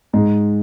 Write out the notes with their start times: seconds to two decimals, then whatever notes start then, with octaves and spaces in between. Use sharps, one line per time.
0.13 G#2 G#3